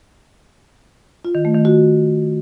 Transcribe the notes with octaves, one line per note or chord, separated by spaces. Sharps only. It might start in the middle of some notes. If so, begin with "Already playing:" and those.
F4
D#3
A3
D#3
F#4